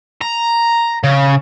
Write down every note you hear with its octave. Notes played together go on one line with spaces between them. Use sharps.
A#5
C#3